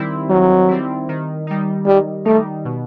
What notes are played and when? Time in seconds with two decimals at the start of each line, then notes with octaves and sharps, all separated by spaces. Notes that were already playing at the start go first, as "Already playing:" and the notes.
Already playing: D#3 G3 C4 E4
0.30 D#3 F#3
0.68 G3 C4 E4
1.09 D#3
1.47 G3 D#4
1.86 D#3 G3
2.25 G3 A3 D#4
2.65 B2